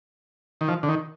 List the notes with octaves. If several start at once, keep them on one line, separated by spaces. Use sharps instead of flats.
D#3
F3
D3
D#3